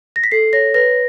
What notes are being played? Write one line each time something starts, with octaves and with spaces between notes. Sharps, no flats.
A#6
B6
A4 C7
C#5 A#6
B4 A#6